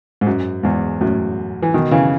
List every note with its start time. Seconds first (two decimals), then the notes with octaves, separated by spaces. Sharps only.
0.21 G#2
0.27 F#2
0.63 E2 G#2
1.01 F#2 A2
1.62 E3
1.74 B2 D#3
1.91 C#3 E3